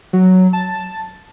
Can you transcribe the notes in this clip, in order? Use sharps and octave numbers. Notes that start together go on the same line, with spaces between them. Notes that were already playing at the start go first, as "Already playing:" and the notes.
F#3
A5